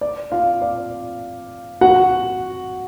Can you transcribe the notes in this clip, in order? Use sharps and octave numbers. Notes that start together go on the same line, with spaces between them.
D5
F4 F5
D5
F#4 F#5